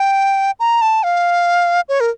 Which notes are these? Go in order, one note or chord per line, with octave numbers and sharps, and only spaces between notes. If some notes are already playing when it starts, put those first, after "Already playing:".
Already playing: G5
A#5
A5
F5
C#5
A#4